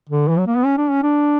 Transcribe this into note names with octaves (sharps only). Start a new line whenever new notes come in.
D3
E3
F#3
A#3
B3
C#4
D4
C#4
D4